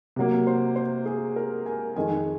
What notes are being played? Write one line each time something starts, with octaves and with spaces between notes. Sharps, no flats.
C3 F#3 A#3
C5
C5
G#4
A#4
G#5
F2 D#3 G#3 G#5